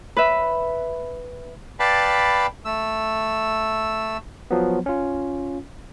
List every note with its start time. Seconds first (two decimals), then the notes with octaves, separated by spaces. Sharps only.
0.17 B4 E5
1.80 B4 D5 F5 G5 A5 B5
2.65 A3 E6
4.51 F3 F#3 B3
4.86 C#4 F4